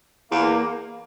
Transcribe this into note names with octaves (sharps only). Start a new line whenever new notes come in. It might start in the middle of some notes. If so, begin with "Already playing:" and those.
E2 A#3